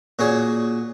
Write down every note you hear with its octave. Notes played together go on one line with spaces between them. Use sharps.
A#2 C#4 F#4 G#4